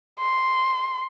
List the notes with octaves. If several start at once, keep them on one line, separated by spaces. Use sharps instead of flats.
C6